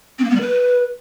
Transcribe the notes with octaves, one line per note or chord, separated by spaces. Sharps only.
C4
A#3
B3
G3
B4